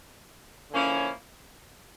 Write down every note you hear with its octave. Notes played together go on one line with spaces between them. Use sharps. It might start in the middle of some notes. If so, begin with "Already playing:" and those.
D3 F3 A#3 C#4 E4